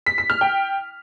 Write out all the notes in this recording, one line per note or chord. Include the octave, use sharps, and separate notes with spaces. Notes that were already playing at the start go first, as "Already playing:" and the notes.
B6
B6
F6
G5